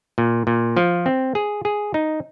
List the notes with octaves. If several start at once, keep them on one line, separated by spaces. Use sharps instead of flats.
A#2
A#2
F3
C4
G#4
G#4
D#4